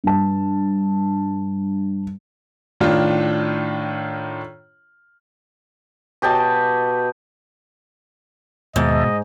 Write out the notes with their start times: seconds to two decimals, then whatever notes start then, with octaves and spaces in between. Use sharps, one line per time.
0.04 G2 A5
2.80 A2 D#3 D4 F4
6.22 B2 G4 D#5 A5
8.76 D#2 G#2 B2 D#5 E5 A5